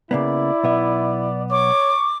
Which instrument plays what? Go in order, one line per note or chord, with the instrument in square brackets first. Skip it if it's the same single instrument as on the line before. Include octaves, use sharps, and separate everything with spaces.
[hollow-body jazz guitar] C#3 A#3 B3 [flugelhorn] E4 [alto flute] D5
[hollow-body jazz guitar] B1 B3 E5
[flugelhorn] C#5 [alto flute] C#6 [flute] D6